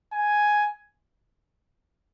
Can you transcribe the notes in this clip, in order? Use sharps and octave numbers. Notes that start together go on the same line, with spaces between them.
G#5